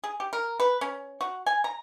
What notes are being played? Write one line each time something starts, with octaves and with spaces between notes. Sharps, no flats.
G#4
G4
A#4
B4
C#4
F#4
G#5
A#5